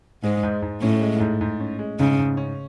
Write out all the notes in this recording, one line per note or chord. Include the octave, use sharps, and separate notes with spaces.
G#2 G#3
G#2
G#2
A2 C#4
G#3
G#2
G#2
C#4
G#3
G#2 C#3
G#2
C#4